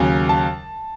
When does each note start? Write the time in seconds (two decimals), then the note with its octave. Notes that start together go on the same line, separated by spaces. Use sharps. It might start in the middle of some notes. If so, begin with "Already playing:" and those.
Already playing: D#2 C#3 F#3 G#5
0.29 A5